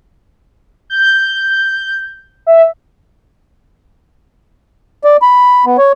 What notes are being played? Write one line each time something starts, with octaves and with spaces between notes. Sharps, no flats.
G6
E5
D5
B5
B3
C#5